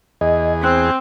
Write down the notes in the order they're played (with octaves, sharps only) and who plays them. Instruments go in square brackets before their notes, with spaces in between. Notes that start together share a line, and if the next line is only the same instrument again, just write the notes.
[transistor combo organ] E2 G#4 [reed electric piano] D#5
[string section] C4 [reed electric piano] F#6